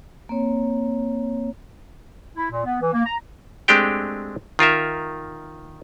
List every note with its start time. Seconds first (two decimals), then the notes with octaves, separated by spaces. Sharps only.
0.29 A#3 C4 C#5
2.35 E4
2.50 A#2
2.65 B3
2.80 E3
2.92 A#3
3.05 A#5
3.68 G#3 A3 C4 D4 G4 G5
4.59 D#3 F4 A#4 E5